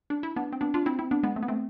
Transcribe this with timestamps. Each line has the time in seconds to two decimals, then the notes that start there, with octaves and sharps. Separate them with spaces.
0.10 D4
0.23 E4
0.36 B3 D4
0.53 C4
0.61 B3 D4
0.74 D4 F4
0.86 C4 E4
0.99 C4 E4
1.11 B3 D4
1.23 G#3 B3
1.36 A3 C4
1.43 B3
1.48 A3 C4